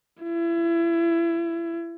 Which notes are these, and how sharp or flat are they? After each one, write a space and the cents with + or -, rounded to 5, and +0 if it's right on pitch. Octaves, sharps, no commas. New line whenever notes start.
E4 +30